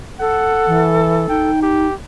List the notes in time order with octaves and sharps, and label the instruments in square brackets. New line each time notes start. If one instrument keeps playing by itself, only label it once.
[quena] A4 [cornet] F#5
[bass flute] E3
[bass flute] D#4 [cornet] G5
[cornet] G4